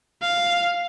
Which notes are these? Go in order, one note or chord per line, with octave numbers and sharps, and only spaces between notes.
F5